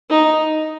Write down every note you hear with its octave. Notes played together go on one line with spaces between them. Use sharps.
D#4